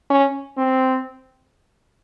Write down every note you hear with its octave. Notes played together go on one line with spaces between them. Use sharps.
C#4
C4